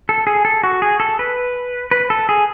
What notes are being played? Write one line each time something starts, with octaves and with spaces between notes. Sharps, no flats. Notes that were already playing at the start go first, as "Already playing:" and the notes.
A4
G#4
A4
F#4
G#4
A4
B4
B4
A4
G#4